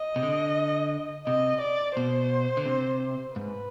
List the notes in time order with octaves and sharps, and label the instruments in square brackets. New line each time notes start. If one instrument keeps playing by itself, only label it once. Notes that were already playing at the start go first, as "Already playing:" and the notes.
Already playing: [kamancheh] D#5
[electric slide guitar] C3
D3
[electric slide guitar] C3 [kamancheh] D#5
[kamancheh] D5
[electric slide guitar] B2 [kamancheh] C5
[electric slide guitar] D3
C3
[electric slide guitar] G#2 [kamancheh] B4